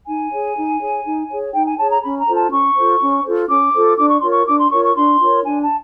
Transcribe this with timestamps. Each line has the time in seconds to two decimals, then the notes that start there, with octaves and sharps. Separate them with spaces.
0.07 D#4 G#5
0.32 G#4 C#5
0.57 D#4
0.81 G#4 C#5
1.05 D#4
1.30 G#4 C#5
1.54 D#4 G5
1.66 G#5
1.78 G#4 C#5 A5
1.91 A#5
2.03 C#4 B5
2.19 A#5
2.27 F4 A4 C5
2.36 A5
2.51 C#4 C#6
2.77 F4 A4 C5
3.00 C#4
3.25 F4 A4 C5
3.49 C#4 D6
3.74 F4 A4 C5
3.98 D4 D6
4.09 C#6
4.20 F4 A#4 C#5 C6
4.31 C#6
4.47 D4 D6
4.59 C6
4.71 F4 A#4 C#5 C#6
4.84 C#6
4.96 D4 C6
5.21 F4 A#4 C#5
5.45 D4 G#5
5.61 A5